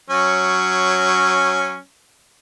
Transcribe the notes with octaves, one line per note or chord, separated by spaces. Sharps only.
F#3 C#4